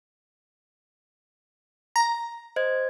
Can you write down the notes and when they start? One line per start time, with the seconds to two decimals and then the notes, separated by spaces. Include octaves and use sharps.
1.96 A#5
2.56 C5 D#5 G#6